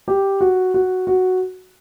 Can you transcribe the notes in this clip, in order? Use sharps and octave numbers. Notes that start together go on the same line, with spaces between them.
G4
F#4
F#4
F#4